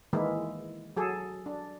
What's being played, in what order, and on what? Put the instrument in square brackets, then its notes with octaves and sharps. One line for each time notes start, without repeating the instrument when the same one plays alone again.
[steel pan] D#3 E3 G#3 A#3 E4
F#3 G#4 A4
D4